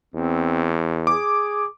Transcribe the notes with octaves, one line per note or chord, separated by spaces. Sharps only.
E2 C4
G#4 D6